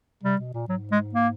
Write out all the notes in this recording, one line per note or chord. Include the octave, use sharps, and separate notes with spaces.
C3 G3
B2
A#2
G#2 F#3
G#3
A#3